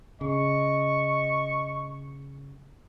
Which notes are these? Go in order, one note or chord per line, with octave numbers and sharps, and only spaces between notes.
C#3 D#5 C#6